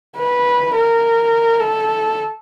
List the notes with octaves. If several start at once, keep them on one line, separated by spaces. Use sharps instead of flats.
B4
A#4
A4